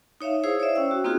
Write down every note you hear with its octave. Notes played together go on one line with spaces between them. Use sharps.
D#4 C#5 E5 F5
E4 G#4 C5 F5 D#6
C#5 D5 E5
C#4 C5 G5 E6
F#4
A#3 C4 D#4 F4 F#4 G#4